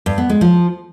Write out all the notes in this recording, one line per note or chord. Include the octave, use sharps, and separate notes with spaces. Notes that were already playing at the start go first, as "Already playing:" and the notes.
G2
B3
G#3
F3